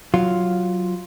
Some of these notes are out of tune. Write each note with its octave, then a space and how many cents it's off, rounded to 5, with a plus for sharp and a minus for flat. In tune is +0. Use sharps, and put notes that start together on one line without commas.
F#3 +0 F4 +0